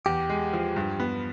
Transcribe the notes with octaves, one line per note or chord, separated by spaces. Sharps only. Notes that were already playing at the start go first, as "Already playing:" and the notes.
E2 G4
G#3
F3
G2
B3